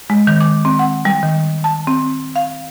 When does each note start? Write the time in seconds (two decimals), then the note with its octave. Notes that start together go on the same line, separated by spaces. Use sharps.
0.10 G#3
0.27 D#3
0.41 D6
0.65 C4
0.79 F#5
1.05 G3
1.23 D#3
1.64 A5
1.87 C4
2.36 F5